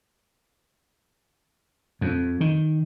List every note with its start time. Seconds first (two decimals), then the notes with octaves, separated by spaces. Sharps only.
2.01 F2
2.41 D#3